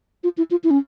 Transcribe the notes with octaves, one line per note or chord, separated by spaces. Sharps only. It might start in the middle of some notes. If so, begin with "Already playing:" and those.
F4
E4
F4
E4
C#4